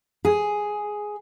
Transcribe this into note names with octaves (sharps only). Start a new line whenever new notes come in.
G#4